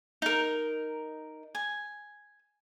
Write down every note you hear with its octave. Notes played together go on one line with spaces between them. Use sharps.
D#4 A#4
G#5